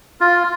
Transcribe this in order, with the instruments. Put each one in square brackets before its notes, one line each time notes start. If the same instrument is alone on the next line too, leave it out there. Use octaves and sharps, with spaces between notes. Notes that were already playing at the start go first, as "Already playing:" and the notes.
[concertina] F4